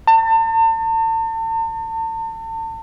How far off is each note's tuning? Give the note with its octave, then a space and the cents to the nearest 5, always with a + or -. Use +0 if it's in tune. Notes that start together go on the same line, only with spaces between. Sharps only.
A5 +40